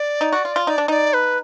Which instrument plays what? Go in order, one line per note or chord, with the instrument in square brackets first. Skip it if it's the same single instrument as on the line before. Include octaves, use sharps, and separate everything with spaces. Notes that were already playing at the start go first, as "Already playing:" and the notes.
Already playing: [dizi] D5
[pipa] D#4
F#4
F4
F4
[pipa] D#4 [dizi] D5
[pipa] D4
[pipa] D#4 [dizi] D5
[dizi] B4